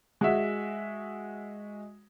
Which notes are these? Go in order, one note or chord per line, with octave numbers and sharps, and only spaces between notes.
G#3 F#4 E5